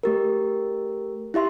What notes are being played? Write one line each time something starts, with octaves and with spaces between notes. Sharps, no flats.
A3 G4 A#4
E4 G4 E5 C6